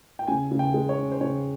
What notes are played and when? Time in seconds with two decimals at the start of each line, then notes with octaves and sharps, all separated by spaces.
0.19 G5
0.27 C#3 G#5
0.51 C#3
0.59 G5
0.74 G#3
0.89 C#5
0.97 C#4
1.12 C5
1.21 C#3 C#5